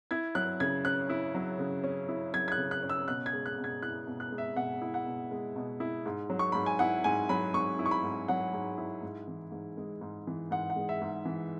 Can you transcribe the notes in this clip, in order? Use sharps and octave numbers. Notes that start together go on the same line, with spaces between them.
E4 G#6
F#3 F#6
C#3 G#6
C#4 F#6
E4
F#3
C#3
C#4
E4
F#3 G#6
G#6
F#6
C#3
F#6
C#4
E6
B2 F#6
G#6
G#3
F#6
B2
G#6
E4 F#6
B2
F#6
G#3
E5
B2 F#5
E4
F#5
B2
G#3
B2
E4
G#2
F#3
C#6
G#2 B5
G#5
E4 F#5
G#2 G#5
F#3 B5
G#2 C#6
E4
C#6
B5
G#2
F#3 F#5
G#2
E4
G#2
E3
G#2
G#3
G#2
E3
G#2 F#5
F#5
G#3
E5
G#2
E3